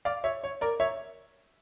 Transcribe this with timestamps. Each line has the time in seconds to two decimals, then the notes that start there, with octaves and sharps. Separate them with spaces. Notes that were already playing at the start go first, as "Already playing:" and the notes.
0.05 D5 F5
0.24 C#5 E5
0.44 C#5
0.61 A#4 D5
0.80 C#5 E5